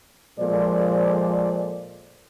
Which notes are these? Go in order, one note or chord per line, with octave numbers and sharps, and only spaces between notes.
A#2 F3 G#3 A4 C5 D5